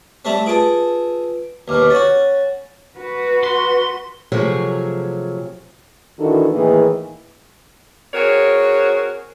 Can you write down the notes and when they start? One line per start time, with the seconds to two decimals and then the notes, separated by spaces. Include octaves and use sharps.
0.25 G3 A3 C4
0.46 F4 G#4 A4 B4 D7
1.68 D#2 B2 B4 D6 F6
1.90 C#4 F#4 A6
2.97 F#4 B4
3.44 C6
4.32 C3 F3 F#3 A3 G#4
6.19 D#3 E3 D4 E4 F#4 A4
6.52 A2 D#3 E3 A3 A#3 G#4
8.14 C4 F#4 G#4 A#4 C#5